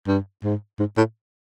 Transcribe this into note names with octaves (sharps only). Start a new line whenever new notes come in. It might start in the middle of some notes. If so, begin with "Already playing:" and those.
G2
G#2
G#2
A2